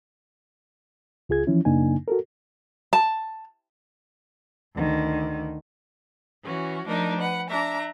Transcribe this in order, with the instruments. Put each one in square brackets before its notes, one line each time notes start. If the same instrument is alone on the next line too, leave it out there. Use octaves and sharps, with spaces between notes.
[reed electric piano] C#2 F4 G#4 G#6
E3 F3 C#4 E4
F#2 C#3 A#3 D4 D#4 G#5
F#4 A4 A#4
[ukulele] A5
[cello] D2 D#3
[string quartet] E3 C#4 F#4
F3 A3 D4 D#4 A#4
B4 F#5
D4 E5 A#5